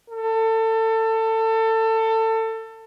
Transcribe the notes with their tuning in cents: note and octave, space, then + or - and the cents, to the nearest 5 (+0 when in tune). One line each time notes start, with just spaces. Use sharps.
A4 +25